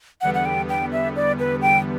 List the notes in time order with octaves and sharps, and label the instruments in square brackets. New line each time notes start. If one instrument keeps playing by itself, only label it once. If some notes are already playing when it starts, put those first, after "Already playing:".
[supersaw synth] E2 D3 G3 B3 [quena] F#5
[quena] F#5
G5
G5
E5
D5
B4
G5